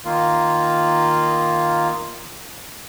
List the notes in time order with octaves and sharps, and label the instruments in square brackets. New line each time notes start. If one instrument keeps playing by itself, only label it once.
[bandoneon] D#3 A#3 F4